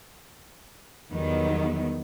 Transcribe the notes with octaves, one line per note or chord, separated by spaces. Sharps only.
E2 D#3 F#3 G3 B3